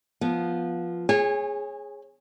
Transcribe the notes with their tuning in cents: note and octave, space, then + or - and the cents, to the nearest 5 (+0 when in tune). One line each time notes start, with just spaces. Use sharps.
F3 +0 B3 -10
G#4 +0 C#5 -20 G#5 -35